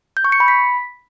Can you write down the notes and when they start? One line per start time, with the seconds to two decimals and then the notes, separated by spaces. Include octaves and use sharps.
0.17 G6
0.24 C#6
0.32 C#7
0.40 B5
0.48 B6